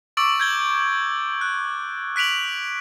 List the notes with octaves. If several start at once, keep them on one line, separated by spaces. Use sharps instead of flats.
C#6 D6 E6 A6 D7 F#7
G6 G#6 G7
F#6
F#6 B6 D7 F7 F#7